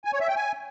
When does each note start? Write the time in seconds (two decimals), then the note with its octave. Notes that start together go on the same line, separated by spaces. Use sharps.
0.05 G#5
0.13 C#5
0.20 E5
0.28 G5
0.36 G#5